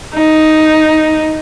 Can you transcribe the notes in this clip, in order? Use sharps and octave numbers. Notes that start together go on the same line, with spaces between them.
D#4